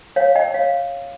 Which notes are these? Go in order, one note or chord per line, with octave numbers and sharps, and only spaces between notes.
C#5 F5
D#5 G5
C#5 F5